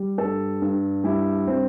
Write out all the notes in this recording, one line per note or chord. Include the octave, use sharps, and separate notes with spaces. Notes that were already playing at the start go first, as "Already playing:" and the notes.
Already playing: G3
G2 A4
G2
G3 E4
G3 C4